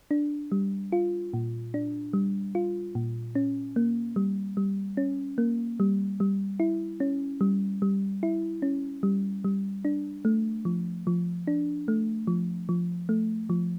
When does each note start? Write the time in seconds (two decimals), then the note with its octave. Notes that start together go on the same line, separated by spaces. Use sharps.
0.11 D4
0.52 G3
0.92 F4
1.33 A#2
1.74 D4
2.13 G3
2.55 F4
2.95 A#2
3.35 C#4
3.76 A#3
4.16 G3
4.57 G3
4.97 C#4
5.38 A#3
5.80 G3
6.20 G3
6.60 E4
7.00 C#4
7.41 G3
7.82 G3
8.23 E4
8.62 C#4
9.03 G3
9.44 G3
9.85 D4
10.25 A3
10.65 F3
11.07 F3
11.47 D4
11.88 A3
12.27 F3
12.69 F3
13.09 A3
13.50 F3